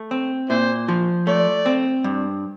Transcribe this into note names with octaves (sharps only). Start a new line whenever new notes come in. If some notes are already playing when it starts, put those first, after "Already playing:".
Already playing: A3
C4
A#2 E4 C5
F3
A3 D5
C4
G2